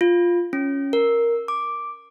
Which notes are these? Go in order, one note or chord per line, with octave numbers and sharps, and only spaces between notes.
F4
C#4
A#4
D6